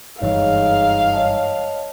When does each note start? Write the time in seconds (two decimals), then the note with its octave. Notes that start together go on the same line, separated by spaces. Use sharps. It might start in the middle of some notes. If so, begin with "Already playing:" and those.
0.22 F#1 G2 E3 G#3 D#4 C#5 F5
1.13 C#5 D#5 A5